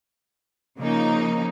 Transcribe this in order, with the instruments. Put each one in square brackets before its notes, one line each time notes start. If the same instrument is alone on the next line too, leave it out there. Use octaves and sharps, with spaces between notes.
[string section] C#3 F3 A#3 D#4